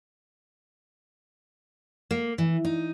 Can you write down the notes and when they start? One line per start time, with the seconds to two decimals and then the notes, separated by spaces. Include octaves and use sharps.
2.11 A#3
2.38 E3
2.65 D#4